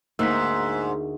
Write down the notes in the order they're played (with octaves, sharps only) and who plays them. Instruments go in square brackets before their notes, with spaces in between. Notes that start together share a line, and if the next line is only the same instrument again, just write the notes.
[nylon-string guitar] D2 A#3 [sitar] G#2 [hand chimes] E6 F#6 B6